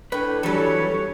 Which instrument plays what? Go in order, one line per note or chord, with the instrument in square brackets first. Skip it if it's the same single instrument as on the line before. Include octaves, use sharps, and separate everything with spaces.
[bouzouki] A2 G4 [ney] D4 [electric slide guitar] B4
[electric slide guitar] E3 F#3 G3 [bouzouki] A4 B4 [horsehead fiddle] C#5